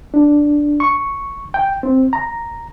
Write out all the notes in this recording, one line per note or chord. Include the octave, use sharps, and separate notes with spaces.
D4
C#6
G5
C4
A#5